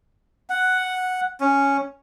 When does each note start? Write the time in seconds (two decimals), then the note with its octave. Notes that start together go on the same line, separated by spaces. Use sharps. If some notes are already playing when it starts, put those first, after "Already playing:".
0.50 F#5
1.41 C#4